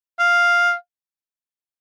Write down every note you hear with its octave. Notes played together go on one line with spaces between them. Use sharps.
F5